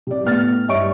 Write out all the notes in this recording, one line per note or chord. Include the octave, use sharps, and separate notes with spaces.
C3 D5
A2 B3 F6 A6
G2 C#5 D#5 E5 C#6 D7